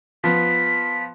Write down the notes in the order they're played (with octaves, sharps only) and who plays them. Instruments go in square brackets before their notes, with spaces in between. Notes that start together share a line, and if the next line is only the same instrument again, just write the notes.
[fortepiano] F3 B3 [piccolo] B6